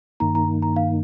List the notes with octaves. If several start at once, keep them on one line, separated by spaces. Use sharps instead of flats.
G2 D#3 A#3 D#4 A#5
A#5
A#5
F5